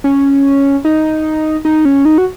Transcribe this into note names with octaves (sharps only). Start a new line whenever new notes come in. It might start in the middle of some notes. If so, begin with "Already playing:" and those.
C#4
D#4
D#4
C#4
D#4
F#4